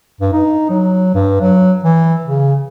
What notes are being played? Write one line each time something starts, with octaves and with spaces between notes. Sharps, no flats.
G2
D#4
F#3
G2
F#3
E3
C#3